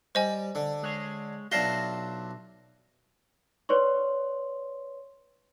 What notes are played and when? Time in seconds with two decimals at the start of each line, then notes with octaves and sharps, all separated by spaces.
0.15 G3 C5 D#5 G#5
0.55 D3
0.83 G#3 G#4 C#5
1.52 B1 D4 F4 F#4 E5 C7 G7
3.69 B4 C#5 D5 C6 C#6